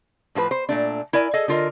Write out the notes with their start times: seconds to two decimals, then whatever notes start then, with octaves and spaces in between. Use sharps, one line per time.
0.35 A2 F3 F4 B4
0.51 C5
0.69 A#2 A3 D4
1.13 E4 A#4 D5 G#5
1.34 G#4 A4 D#5
1.48 D3 F4 A#4 D#5